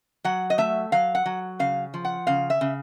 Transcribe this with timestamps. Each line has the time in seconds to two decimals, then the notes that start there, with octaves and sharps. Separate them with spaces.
0.25 F#3 F#5
0.50 D#5
0.58 A3 E5
0.92 F#3 F5
1.15 F#5
1.26 F#3
1.59 C#3 F5
1.94 F3
2.05 F#5
2.27 C#3 F5
2.50 E5
2.61 C#3